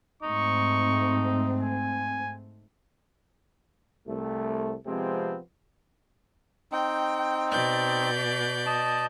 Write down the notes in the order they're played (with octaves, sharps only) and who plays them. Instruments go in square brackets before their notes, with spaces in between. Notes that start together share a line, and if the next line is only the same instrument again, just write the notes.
[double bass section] G#2 A3 C4 [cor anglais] D#4 [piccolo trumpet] C#6
[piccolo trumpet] G#5
[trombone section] C2 A3
C3 F3 G#3 B3 C4
[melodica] C4 D#4 [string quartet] G5
[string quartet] B2 D5 G6
[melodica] D#5 A5